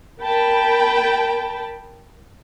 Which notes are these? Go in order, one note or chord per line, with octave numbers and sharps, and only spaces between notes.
A#4 G5 A5 B5